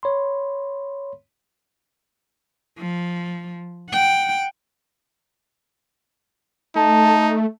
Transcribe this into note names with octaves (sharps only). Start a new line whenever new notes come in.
C#5 B5 C6
F3
F#5 G5
A3 D#4 A5